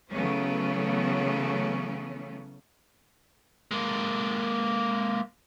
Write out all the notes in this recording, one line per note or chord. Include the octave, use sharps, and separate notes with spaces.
C#3 E3 F#3 A3 B3 C#4
G#3 A#3